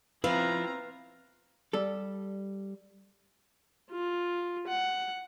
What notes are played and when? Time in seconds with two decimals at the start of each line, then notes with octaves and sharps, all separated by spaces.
0.24 F3 C4 E4 B4 F5 A#5
1.73 G3 A4
3.91 F4
4.67 F#5